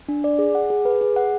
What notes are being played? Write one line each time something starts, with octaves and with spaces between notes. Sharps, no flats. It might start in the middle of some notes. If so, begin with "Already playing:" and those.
D4
D5
G#4
F#5
G#4
B4
G#4
F#5